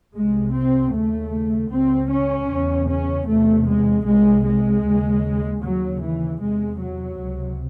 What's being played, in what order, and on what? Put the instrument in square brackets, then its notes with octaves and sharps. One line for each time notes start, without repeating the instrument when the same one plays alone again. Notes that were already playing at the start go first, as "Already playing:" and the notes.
[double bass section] C2 C3 G#3
C4
D#2 C#3 A3
C#2 C#3 C4
C#4
E2 C#3
C#4
E2 C3 A3
G#3
C2 C3 G#3
G#3
D#2 C#3
D#2 C#3 F#3
E3
E2 C3 G#3
F#3
C#2 C3